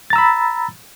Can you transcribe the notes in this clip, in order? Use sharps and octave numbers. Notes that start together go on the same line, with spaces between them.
A#5 B5 E6 A6